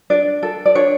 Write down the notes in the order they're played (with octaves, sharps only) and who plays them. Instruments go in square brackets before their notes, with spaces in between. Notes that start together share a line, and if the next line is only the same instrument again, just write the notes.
[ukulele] D4 D5
A4
D5
D4 C#5